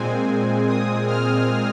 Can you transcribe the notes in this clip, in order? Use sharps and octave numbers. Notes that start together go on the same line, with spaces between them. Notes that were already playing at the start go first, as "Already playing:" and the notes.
Already playing: A#2 G#3 C4 G#5
D#6
F6